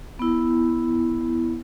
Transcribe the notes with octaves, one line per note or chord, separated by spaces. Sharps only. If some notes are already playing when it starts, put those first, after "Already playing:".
B3 E4